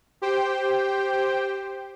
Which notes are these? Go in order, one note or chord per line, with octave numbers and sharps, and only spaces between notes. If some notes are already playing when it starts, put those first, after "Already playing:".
G4 C5 G5